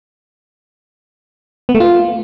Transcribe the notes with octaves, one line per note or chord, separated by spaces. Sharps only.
B3
A3
F4